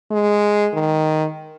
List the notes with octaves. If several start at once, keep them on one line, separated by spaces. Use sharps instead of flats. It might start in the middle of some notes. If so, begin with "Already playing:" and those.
G#3
D#3